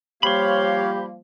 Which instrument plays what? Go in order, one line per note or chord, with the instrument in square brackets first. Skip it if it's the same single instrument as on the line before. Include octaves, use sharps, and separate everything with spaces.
[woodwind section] F3 G3 A#3 [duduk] G4 [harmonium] C#5 F5 [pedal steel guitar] B5 C6